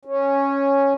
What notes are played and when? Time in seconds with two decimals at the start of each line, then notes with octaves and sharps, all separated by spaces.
0.05 C#4